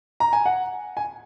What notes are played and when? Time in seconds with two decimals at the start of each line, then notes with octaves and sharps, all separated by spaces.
0.20 A#5
0.33 G#5
0.46 F#5
0.97 G#5